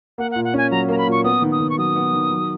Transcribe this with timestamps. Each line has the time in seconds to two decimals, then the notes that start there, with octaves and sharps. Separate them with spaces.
0.18 A#3 F#5
0.31 A#2 F#5
0.45 F#5
0.54 C#4 G#5
0.71 F#3 A#5
0.89 A#3 A#5
0.98 B5
1.07 A#2
1.12 C#6
1.24 B3 D#6
1.42 D#3
1.52 D#6
1.60 D#3
1.70 C#6
1.78 F#3 D#6
1.96 B3
2.13 D#3
2.31 F#3